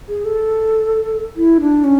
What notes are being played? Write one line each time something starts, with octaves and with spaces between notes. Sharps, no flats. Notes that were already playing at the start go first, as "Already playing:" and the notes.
G#4
A4
E4
D4
C#4